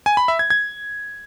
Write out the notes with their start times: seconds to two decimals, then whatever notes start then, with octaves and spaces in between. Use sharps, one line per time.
0.06 G#5
0.17 B5
0.28 E5
0.39 G#6
0.50 G#6